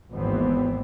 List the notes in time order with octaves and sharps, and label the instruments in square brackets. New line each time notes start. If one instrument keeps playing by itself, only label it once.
[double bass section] G#1 D#2 E3 B3 C4